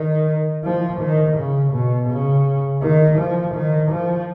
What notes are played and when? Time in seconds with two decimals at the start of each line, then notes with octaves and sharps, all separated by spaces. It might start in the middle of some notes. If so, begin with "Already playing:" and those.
Already playing: D#3
0.64 F3
1.00 D#3
1.36 C#3
1.73 B2
2.09 C#3
2.82 D#3
3.18 F3
3.55 D#3
3.91 F3